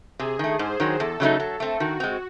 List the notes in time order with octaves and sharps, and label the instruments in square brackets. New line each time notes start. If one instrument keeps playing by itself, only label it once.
[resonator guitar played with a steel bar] C3 [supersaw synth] G#4
[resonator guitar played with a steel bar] D#3 A3
[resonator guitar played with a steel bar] G#2 [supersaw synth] C5
[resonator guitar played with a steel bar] D#3 F#3
[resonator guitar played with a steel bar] E2 [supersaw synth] A4
[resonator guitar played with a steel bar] C#3 F#3 A3 D#4
F#3
A3 C4
[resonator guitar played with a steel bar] D#3 [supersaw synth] F#4
[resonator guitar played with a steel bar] G#3 C4